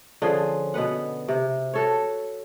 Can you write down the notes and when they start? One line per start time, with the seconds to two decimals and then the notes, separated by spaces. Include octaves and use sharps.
0.22 D3 F3 C#4 G#4
0.74 B2 B3 B4 F#5
1.28 C3
1.74 F#4 A4 C#5